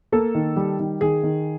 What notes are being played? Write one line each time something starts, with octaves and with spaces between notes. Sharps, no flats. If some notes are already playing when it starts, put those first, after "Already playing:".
A#3 A4
D#3
G3
D#3
D#3 G#4
D#3